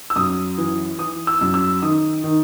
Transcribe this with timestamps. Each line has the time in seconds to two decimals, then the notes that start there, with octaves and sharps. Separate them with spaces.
0.10 E6
0.16 F#2 D#6
0.58 E3
0.99 E3 D#6
1.27 E6
1.41 F#2
1.54 E6
1.82 D#3 D#6
2.24 D#3